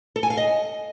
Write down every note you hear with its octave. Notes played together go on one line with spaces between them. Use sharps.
A4
G#5
F5
D#5